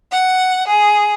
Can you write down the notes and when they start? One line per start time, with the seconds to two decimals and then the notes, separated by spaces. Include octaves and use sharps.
0.12 F#5
0.68 G#4